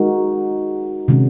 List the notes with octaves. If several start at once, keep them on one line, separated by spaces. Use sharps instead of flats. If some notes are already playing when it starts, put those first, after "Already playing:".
Already playing: G#3 D#4 F#4 A#4
C3 D#3 G#3 C#4